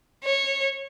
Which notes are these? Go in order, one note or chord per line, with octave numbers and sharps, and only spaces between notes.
C#5